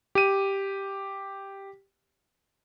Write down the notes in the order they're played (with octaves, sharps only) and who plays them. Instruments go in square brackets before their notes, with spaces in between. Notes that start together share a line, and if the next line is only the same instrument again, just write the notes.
[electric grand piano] G4 D#7